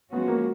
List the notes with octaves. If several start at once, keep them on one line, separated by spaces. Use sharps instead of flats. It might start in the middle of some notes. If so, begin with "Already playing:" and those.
F3 G#3 B3 C#4 F#4
A#3